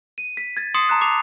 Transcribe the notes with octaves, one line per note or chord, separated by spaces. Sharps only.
D#7
B6
G#6 A6
C6 D#6 C7 C#7 E7
A5 A#5 C6 F#6
D6 C7 F7